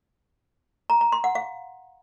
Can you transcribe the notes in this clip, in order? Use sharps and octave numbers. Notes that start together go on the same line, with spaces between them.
A#5
A#5
C6
F#5
F5